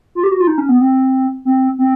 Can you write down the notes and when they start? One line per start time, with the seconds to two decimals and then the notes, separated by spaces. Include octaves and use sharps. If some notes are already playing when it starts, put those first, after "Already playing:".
0.15 F4
0.23 G4
0.31 F#4
0.40 F4
0.47 D#4
0.58 C#4
0.69 B3
0.81 C4
1.45 C4
1.78 C4